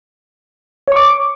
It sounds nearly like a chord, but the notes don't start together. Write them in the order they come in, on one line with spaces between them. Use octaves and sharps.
C#5 C#6 D6